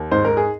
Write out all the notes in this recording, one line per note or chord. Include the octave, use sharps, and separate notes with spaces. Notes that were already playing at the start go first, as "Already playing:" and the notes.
Already playing: D#2
G#2 C5
A#4
G#4